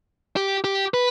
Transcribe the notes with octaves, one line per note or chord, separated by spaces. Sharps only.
G4
G4
B4